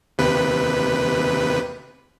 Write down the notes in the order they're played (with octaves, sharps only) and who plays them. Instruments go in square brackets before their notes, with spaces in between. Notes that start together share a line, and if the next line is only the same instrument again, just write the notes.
[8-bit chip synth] D#2 C3 B4